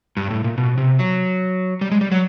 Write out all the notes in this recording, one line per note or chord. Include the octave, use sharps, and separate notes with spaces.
G2
A2
A#2
B2
C3
F#3
G3
G#3
G3
F#3